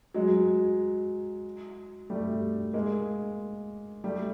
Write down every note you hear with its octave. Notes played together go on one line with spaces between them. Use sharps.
F#3 G#3
G3 A3
G#3 A#3
G3 A3